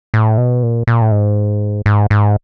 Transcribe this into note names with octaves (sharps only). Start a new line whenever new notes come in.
A2
B2
A#2
A#2
A2
G#2
G#2
G#2